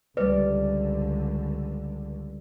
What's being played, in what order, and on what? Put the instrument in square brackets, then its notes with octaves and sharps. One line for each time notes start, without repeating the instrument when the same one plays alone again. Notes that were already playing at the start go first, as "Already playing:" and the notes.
[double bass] C#2 D3 [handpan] G3 D5 [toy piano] B4